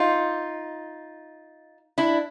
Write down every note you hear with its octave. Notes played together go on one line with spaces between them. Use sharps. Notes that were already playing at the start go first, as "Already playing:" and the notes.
Already playing: D#4 F4
D4 E4